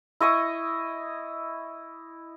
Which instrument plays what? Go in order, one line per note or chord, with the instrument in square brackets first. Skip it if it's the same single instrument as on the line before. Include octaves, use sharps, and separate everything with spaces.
[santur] E4 D#5 C#6 D#6